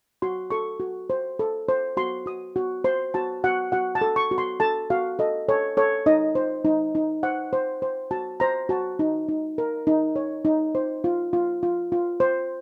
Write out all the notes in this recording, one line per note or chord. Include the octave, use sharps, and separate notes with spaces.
F#4 C6
A4 C#6
F#4
C5
A4
C5
F#4 C6
F#4 D#6
F#4
C5 C6
F#4 A5
F#4 F#5
F#4 F#5
A5
A4
C#6
F#4
C6
A4 A5
F#4 F5
A4 D#5
A4 C#5
A4 C#5
D#4 D#5
C5
D#4
D#4
C5 F#5
C5
C5
F#4 A5
C5 A#5
F#4 A5
D#4
D#4
A#4
D#4
C#5
D#4
C5
F4
F4
F4
F4
C5